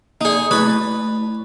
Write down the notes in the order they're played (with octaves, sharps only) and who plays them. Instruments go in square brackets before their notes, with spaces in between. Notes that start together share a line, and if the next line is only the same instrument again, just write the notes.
[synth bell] A#3 D5 [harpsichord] D#4 G#4
[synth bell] A3 E4 [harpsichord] B4 C#5 B5